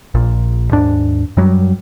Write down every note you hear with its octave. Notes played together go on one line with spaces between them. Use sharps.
A#1 A#2
D#2 G#2 D4
F#2 F#3 G3